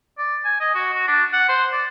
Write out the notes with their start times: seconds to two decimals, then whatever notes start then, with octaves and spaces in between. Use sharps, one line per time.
0.18 D5
0.45 G#5
0.61 D#5
0.74 F#4
0.94 F#4
1.08 D4
1.33 F#5
1.49 C5
1.72 D5